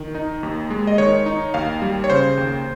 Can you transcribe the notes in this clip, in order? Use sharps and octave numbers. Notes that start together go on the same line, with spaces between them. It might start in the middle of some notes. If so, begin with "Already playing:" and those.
Already playing: D#3
D#4
D#2
G#3
D#5
D#3 C#5
D#4
D#2 F5
G3
C#5
C#3 C5
D#2